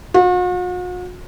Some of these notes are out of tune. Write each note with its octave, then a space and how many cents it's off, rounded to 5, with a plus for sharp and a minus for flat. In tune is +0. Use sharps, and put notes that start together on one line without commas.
F#4 -45